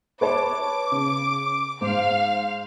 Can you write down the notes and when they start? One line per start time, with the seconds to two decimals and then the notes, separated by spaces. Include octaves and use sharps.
0.21 B4 C#5 A5 D6
0.92 C#3
1.81 G#2 C5 F5